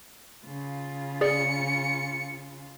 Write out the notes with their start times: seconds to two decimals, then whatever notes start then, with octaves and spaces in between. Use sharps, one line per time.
0.45 C#3 F4
1.21 G#4 D5 C#7